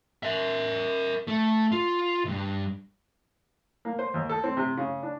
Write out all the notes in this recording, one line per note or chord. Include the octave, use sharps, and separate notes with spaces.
A#4 E5
A3
F4
C#2 G2
A#3
C5
D#2
A4
C4
C3
C#3
D4